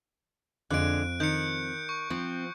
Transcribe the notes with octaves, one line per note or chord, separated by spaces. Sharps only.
F2 D3 G#3 F#6 D7
D#3 G6 C#7
C#6
F3 C4